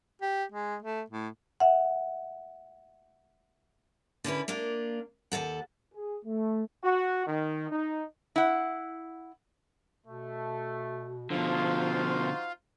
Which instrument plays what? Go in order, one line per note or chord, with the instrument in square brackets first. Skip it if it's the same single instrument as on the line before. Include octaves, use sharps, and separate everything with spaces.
[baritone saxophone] G4
G#3
A3
A2
[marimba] E5 F#5
[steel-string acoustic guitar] D3 C#4 E4 B4
A#3 D4 F4
D#2 G#2 A4 F#5
[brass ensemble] G#4
A3
[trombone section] F#4
D#3
D#4
[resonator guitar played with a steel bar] E4 F#5
[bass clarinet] B2 [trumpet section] A3
[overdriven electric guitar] B2 D3 [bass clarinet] F3 [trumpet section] D#4 F#4 C5 [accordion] F4